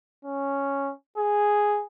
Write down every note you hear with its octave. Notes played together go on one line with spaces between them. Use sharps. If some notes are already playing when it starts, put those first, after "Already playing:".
C#4
G#4